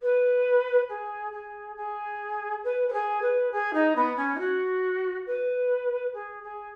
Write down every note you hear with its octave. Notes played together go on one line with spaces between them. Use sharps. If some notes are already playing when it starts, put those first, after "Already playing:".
B4
G#4
G#4
G#4
B4
B4
G#4
B4
G#4
D#4
B3
C#4
D#4
F#4
B4
G#4
G#4